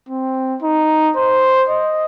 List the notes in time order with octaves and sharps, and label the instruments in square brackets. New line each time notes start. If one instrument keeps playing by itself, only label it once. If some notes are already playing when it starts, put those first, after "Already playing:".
[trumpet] C4
D#4
C5
D#5